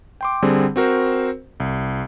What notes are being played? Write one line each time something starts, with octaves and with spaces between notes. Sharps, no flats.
G5 C6 D6
D3 G3 C4 G#4
C4 F#4 A#4 C5
C2